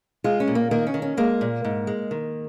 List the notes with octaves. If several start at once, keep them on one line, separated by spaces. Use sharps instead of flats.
G#3 F4
C#4
A#2
A#3
D#3 A#3
C#4
D#3
C#4
G#3 A#3
A#2
G#2
G#3
D#3